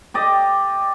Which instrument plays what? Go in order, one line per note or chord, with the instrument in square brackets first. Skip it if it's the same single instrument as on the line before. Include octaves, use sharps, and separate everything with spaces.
[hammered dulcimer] G4 D5 D#5